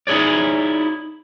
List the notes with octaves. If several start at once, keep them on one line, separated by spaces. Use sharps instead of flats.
D#4 E4 G#4 C#5 D5